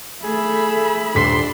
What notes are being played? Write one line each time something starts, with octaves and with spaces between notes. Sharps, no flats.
A3 G#4 E5 B5
D#1 D4 C6 B6